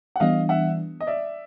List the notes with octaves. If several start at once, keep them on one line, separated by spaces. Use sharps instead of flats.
F#5
E3 G3 B3 D4 D#5 F5
E5 F#5
D#5
D5 E5